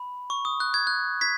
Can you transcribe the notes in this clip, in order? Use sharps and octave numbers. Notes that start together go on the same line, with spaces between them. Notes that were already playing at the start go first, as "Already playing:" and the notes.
Already playing: B5
C#6
D#6
F#6
G#6
F#6
G#6 B6